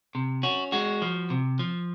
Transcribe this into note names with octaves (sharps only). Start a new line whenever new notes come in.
C3
C#4 F#4
G#3 F#4
F3
C3
F3